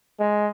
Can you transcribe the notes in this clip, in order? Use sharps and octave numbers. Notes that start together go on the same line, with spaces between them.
G#3